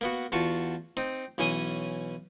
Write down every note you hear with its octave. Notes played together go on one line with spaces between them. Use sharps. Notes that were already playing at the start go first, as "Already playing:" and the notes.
A#3 B3 F#4
E2 F4 F#4 A5 C#6
C4 D#4
B1 E3 C#4 G#5 C6 D#6